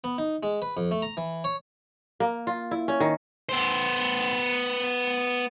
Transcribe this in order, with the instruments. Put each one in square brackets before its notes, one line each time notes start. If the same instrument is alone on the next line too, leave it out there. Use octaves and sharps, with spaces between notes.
[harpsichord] B3
D#4
G#3
B4
F2
A3
A#5
E3
C#5
[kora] A#3
F4
E4
C#4
D#3
[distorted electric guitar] B3 C5